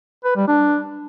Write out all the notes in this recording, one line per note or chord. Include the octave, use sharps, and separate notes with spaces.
B4
G3
D4